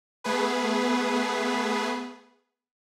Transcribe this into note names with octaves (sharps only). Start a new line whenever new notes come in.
A3 B3 G#4 B4